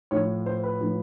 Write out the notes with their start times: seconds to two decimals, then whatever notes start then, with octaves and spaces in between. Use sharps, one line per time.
0.11 A2 F3 C#5
0.46 C5
0.63 B4
0.81 A2 F3